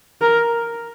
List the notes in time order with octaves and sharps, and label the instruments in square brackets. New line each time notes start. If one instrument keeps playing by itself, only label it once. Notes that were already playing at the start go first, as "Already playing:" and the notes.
[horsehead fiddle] A#4